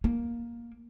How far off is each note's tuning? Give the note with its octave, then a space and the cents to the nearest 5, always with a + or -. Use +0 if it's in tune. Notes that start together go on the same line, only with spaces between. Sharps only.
A#3 +10